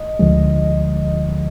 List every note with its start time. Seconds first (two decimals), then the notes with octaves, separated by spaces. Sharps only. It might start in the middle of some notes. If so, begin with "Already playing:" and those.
Already playing: D#5
0.19 D2 D3 F3 G#3